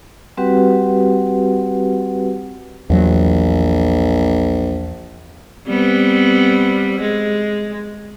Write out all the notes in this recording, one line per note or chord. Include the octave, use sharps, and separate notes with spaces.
G3 C4 F#4 G4 B4 F#5
A#1 E2 F#3
G3 B3 C4
G#3